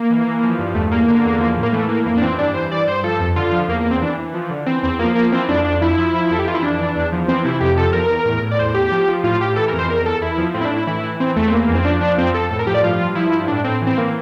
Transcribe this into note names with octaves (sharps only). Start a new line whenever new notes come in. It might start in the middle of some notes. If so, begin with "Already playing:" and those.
Already playing: A#3
E3
E3
F3
G2
E2 A3
E2 A#3
D3
E2
F3
A2
A#3
E3 A3
A2 A#3
F2 A#3
D4
E3 C4
G2 D4
E3 C5
G2 D5
G2 C5
F3 A4
F2
D3 F4
F3
E2 A#3
A#3
E2
C4
E3 D4
E3
F3
D3
E3 C4
E2 C4
F3 A#3
F3 A#3
E3 C4
F2 D4
F2 D4
F3 E4
F3
F3
F2 A4
G4
E3 F4
E4
F2 D4
E3
E2
F3
E3 C4
C3 E4
F2 G4
F3 A4
E2 A#4
E2
A2
A2
D5
E2 C5
E2 G4
F3
F3
A2 F4
A2 G4
E3 A4
A#4
F2
C5
E2 A#4
E2 A4
E2 E4
F3
A2 C4
E4
D4
A2
E4
E3 E4
E3
E3 C4
E2 A3
C4
E3 A#3
F2
C4
F3 D4
F3 D4
F2 C4
F2 A4
A2 A4
A#4
F3 G4
D5
G2 F4
G2
F3 E4
G2
A2 D4
A2 C4
E3
C4
E3 A#3